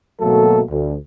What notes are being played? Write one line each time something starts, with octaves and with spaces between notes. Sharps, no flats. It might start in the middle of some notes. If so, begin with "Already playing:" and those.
G#1 B2 F#3 A3 A#3 A4
D2